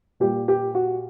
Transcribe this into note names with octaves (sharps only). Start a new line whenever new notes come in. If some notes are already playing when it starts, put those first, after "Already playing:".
A#2 G3 G4
G4
F#4